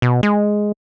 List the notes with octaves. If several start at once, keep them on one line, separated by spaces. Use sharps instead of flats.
B2
G#3